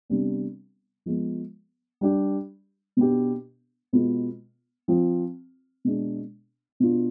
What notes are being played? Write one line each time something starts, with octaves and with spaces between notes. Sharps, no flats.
C3 G3 B3 D4
F3 G#3 B3
G3 D4 G4
B2 B3 D4 G4
B2 G#3 B3 F4
F3 C4 F4
B2 G#3 D4
B2 B3 D4 F4